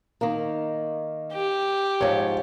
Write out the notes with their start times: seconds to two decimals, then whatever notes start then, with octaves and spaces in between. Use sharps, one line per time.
0.21 D#3 A#3
1.33 G4
2.01 G#2 F3 C#5